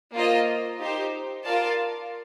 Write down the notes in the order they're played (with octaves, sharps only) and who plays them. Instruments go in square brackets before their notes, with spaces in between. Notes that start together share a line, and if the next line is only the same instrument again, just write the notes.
[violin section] A#3 F4 C5 D#5
D#4 G4 C5
F4 A#4 D5 F5 A5